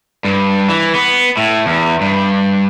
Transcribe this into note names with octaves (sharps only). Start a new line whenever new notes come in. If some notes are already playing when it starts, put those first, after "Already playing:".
G2
E3
B3
A2
E2
G2